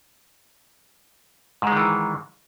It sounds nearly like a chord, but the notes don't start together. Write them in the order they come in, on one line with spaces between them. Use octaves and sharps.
G#2 G#3 D#3 E3